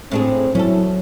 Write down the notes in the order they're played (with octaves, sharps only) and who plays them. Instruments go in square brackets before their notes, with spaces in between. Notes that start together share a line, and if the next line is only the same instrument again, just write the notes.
[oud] A2 D4 G#4 [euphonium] C4
[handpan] F#3 [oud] C#4 A4 [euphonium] E4